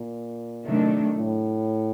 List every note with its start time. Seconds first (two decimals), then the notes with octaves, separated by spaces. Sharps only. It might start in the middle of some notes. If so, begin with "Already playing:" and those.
Already playing: A#2
0.63 C3 D#3 F#3 A3 D4
1.17 A2